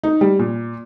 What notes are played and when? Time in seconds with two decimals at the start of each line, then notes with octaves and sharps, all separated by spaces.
0.03 D#4
0.21 G3
0.39 A#2